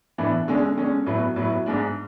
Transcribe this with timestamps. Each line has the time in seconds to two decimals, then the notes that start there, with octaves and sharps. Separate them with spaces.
0.18 A2 E3 B3 D4
0.48 D3 G#3 C#4
0.77 D3 G#3 C#4
1.06 A2 F#3 B3 E4
1.36 A2 F#3 B3 E4
1.66 G#2 G#3 D4